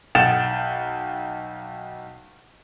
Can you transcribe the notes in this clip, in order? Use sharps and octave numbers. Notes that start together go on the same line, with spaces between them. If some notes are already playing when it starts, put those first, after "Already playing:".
B1 F#5 G5 A6 E7